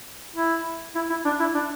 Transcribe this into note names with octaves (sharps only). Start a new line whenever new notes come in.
E4
E4
E4
D4
E4
D4